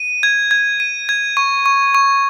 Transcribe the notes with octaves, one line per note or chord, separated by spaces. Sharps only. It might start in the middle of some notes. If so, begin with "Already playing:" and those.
Already playing: D#7
G#6
G#6
D#7
G#6
C#6
C#6
C#6